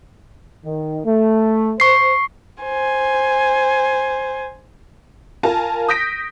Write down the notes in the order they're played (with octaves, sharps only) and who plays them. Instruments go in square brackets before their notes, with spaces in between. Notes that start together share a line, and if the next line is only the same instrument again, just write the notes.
[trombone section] D#3
A3
[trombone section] C5 [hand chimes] C#6 C7
[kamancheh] C5 G#5
[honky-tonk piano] F4 A#4 G#5 A5
D#6 G6 A#6 B6 D7